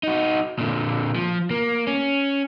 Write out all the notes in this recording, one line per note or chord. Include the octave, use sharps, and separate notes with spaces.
D#4 F#4
A#2 D3
F3
A#3
C#4